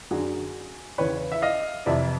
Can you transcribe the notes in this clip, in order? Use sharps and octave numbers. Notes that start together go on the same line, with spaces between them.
F#2 D3 F#4 G#4
E2 C#3 E3 B4 C#5
E5
D#5 F5
F2 C3 E3 D5 E5